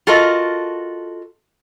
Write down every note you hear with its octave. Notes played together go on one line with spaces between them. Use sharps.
F4 F#4 A4 A#4 D#5